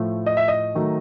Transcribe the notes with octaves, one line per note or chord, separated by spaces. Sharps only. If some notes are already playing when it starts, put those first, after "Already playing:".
Already playing: A2 F3 A3
D#5
E5
D#5
D#3 F#3 A3